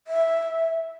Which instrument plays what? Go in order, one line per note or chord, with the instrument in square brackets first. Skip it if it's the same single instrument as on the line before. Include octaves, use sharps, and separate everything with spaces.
[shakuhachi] E5